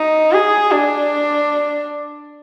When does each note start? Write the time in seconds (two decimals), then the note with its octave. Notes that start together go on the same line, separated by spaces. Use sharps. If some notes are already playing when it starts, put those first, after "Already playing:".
Already playing: D#4
0.32 G#4
0.71 D4